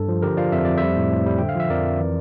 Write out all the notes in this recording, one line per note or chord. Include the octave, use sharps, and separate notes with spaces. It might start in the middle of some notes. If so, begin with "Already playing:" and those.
Already playing: G2 A4
F3
D3 G4 A#4
F3 D5 F5
F2 E5
F2 D5
G3 C5 E5
A2
A2
G3
D3 G5
F5
F3 E5
F2 A#4 D5
F2
E3